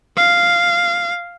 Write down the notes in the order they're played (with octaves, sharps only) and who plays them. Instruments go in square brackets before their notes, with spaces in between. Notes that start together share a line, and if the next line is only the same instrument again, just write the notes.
[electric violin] F5